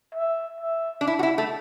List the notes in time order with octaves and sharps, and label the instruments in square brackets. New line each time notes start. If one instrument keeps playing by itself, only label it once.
[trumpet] E5
E5
[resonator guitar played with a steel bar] D4
E4
F#4
E4
A3